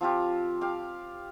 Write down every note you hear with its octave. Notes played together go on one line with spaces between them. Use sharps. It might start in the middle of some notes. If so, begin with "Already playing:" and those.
F3 C4 F4 G4
G4 F5